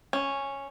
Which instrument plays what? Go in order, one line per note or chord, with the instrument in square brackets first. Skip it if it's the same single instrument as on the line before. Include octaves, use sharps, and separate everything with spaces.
[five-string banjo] C#4